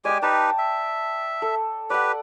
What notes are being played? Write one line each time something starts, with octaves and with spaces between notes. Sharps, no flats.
G#3 G4 D5 G5 G#5
D#4 G4 B4 A5
E5
A4
G4 B4 D5 F#5